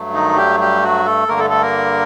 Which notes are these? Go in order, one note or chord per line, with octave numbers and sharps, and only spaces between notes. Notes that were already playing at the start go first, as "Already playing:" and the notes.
Already playing: G2 F#3 A3
D#3 D#4
G3 G4
G3 G4
F#3 F#4
A3 A4
G2 D3 A3 A#3 A#4
A3 A4
A3 A4
A#3 A#4